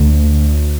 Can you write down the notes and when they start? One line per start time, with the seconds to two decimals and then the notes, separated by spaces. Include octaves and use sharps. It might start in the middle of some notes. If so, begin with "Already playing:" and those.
Already playing: D2